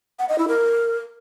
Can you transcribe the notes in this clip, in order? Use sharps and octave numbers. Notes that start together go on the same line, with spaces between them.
F#5
D#5
E4
A#4